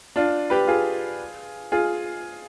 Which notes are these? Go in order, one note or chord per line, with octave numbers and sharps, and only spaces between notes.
D4 F4
G4 B4
F4 G#4
F4 G#4